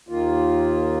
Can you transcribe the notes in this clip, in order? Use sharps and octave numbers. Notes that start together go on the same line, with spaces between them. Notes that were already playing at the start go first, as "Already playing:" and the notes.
D#2 D#3 A#3 F4